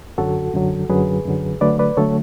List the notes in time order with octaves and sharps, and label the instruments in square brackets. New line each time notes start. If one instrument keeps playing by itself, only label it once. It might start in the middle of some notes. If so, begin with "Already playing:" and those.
[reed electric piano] F#2 D3 F#3 F#4 A4
F#2 D3 F#3
F#2 D3 F#3 G#4 B4
F#2 D3 F#3
D3 F#3 A3 B4 D5
B4 D5
D3 F#3 A3 A4 C#5